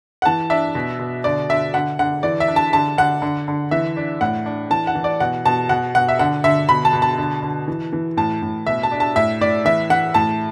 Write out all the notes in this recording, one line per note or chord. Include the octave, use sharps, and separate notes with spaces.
F#5
E3 A5
D4 E5
B2
B2
D3 D5
D3 E5
D3 F#5
D3 F#5
E3 D5
E5
D4
A5
D3 A5
D3 F#5
D3
D3
E3 E5
D4
A2 F#5
D4
E3 A5
F#5
E3
D5
B2 F#5
B2 A5
B2 F#5
B2 F#5
E5
D3 F#5
D3 E5
B2 B5
A5
B2
A5
D3
D3
E3
E3
A2 A5
A2
B2 E5
A5
D4
A5
A2 E5
A2 D5
E3 E5
E3 F#5
A2 A5